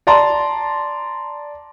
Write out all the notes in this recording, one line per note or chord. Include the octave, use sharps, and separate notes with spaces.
D5 A5 A#5 C6